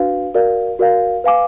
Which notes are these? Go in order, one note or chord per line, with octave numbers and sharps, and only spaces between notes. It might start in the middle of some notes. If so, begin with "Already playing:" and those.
Already playing: D4 F#4 B4 F5
F#4 A#4 D5 F5
F#4 A#4 D5 F5
B4 F5 G#5 D6